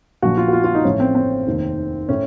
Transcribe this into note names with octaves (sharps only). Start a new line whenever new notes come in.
A#1 A#2 F3 F#4
F4
F#4
F4
F4
D#4
A1 A2 F3 C#4
C4
C4
F1 D#2 D#3
A2 C#4